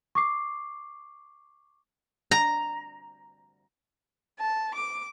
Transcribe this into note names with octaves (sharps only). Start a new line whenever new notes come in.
C#6 D6 C7
A#5
A5
D6